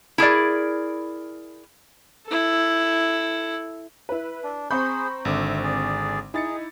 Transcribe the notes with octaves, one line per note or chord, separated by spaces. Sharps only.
E4 G#4 A#4 D5
E4 A4
E4 B4
D4
C4 G#4 C5 A#5 B5 C#6 G6
G#1 D3 E5 D6
G#4 D5
D#4 E4 G#4 A6 C#7